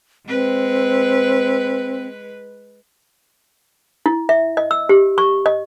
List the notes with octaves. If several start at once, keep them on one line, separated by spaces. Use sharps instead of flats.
G#3 C4 B4
E4
E5
D#5
E6
G4
C#6
D#5